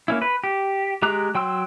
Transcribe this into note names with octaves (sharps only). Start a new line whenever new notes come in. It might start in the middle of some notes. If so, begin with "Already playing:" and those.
A#3 C#4 E4
B4
G4
G#3 G4 A#5 D6 F#6
F#3 G5 C6 E6